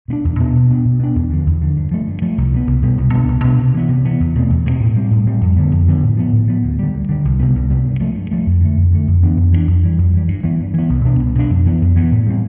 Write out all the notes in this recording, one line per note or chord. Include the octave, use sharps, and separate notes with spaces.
B2 B3 D4
E2
B2 B3 D4
B2
B3 D4
B2
B3 D4
E2
D3 F3
E2
D3 F3
G2
F3 A3
G2
F3 A3
C2
B2 G3 B3
C2
B2 G3 B3
C2
B2 B3 D4
C2
B2 B3 D4
C3
E3 B3
C3
E3 B3
E2
B2 A3 C4
E2
B2 A3 C4
A2
G3 C4
A2
G3 C4
F2
D3 F3 B3
F2
D3 F3 B3
A2
F3 B3
A2
F3 B3
D2
D3 G3
D2
D3 G3
C2
C3 G3 B3
C2
C3 G3 B3
G2
F3 A3
G2
F3 A3
F2
D3 A3
F2
D3 A3
F2
E3 B3 D4
F2
E3 B3 D4
F2
E3 G3
F2
E3 G3
G2
E3 B3
G2
E3 B3
C2
B2 B3 D4
C2
B2 B3 D4
F2
E3 B3
F2
E3 B3
A2
G3 C4